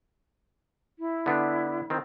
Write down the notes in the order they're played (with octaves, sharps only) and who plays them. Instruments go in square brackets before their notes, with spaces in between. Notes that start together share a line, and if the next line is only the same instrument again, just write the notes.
[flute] E4
[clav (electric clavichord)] D3 B3 D4
D#3 C4